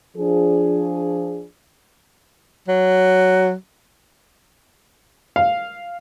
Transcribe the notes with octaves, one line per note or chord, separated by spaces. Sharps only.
F3 D4 G#4
F#3
F5